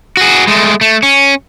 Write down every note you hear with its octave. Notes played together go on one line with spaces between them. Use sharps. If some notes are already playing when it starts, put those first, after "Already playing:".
F#4 G#4
G#3 A3
A3
C#4